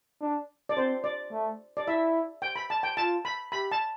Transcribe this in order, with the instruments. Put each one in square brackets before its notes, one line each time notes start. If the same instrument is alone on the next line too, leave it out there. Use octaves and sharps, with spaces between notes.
[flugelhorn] D4
[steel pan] D5
[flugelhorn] C4 [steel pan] C5
[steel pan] D5
[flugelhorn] A3
[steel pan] D5
[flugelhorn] E4 [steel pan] E5
[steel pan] G5
B5
A5
G5
[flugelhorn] F4 [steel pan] A5
[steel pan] B5
[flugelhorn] G4 [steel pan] B5
[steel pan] A5